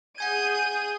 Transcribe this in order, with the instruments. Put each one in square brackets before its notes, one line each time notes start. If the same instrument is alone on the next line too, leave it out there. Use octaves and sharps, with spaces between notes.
[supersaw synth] G#4 [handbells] F#5 G#5 G#6 [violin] G6 D#7